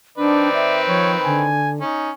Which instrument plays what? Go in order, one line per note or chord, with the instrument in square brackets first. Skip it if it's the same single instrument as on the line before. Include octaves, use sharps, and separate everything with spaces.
[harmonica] D#3 C4 B4 [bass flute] D4 [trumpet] D5
[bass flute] E5
[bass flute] F3 [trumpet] C#5
[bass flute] D3 [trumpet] G#5
[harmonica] C#4 [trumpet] D#4